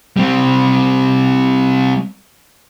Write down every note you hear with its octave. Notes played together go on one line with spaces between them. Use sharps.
G3 C4